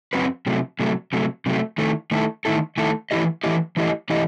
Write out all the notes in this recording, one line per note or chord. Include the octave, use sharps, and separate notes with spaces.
F#2 F#3 C4 F#4 B4
C3 F#3 A3
C3 F#3 A3
C3 F#3 A3
C3 F#3 A3
D#3 A3 E4 A4
D#3 A3 E4 A4
D#3 A3 E4 A4
D#3 A3 E4 A4
E3 A3 E4 G4 D#5
E3 A3 E4 G4 D#5
E3 A3 E4 G4 D#5
E3 A3 E4 G4 D#5